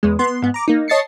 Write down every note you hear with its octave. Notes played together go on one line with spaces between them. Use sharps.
E2 G#3
B3 C6
G#2 B3
A#5 D6
A#3 D#4
C#5 D#5 A5 A6 C7 C#7